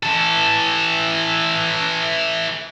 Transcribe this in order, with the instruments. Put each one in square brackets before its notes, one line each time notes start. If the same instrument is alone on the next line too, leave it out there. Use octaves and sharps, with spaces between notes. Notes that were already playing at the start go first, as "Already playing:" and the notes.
[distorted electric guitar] E3 A4